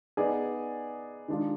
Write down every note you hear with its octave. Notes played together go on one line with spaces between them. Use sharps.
B3 D#4 G#4 D5
D#3 G#3 D4 F4